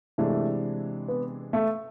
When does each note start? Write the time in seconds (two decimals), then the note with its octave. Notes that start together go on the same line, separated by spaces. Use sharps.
0.18 C3 E3 G#3 A3 D4
1.08 B3
1.53 A3